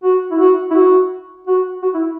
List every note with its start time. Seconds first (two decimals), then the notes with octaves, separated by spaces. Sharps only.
0.04 F#4
0.31 E4
0.39 F#4
0.71 E4
0.75 F#4
1.47 F#4
1.83 F#4
1.94 E4